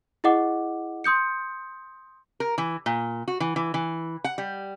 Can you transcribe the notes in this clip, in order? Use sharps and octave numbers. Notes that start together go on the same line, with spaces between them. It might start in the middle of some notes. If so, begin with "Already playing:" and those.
E4 G#4 D#5 F#5 D6
C6 D#6 G6 C#7
A#4
E3
A#2
F#4
E3
E3
E3
F#5
G3